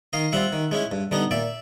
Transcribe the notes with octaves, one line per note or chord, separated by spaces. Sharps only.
D#3 D#5 F5
G3 C4 F4 E5 F#5
D#3
G#3 C#4 E4
G2
D3 G3 B3 D#4
A#2 D5 E5